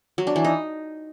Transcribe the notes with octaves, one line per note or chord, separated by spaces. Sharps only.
F#3
D4
E3
D#4